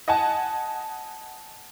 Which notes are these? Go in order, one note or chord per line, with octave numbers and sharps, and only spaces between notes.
D#5 F#5 G#5 A5